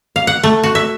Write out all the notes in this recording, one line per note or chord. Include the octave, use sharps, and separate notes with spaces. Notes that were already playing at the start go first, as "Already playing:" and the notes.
F5
F#5
A3
F#4
E5